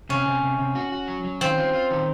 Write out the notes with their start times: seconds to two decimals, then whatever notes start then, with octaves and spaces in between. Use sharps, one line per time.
0.09 C3 C#4
0.26 C3
0.42 C3
0.59 C3
0.75 F#4
0.92 F#4
1.08 F#3
1.24 F#3
1.41 D#3 C4
1.58 F4
1.73 F4
1.91 D#3